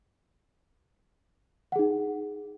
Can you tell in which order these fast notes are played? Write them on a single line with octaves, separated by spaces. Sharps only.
F#5 G#4 D#4